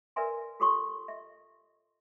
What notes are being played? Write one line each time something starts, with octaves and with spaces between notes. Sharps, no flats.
A#4 B4 D5 E5 G#5 C6
F4 G4 A4 C#5 C6 C#6
D#5 E5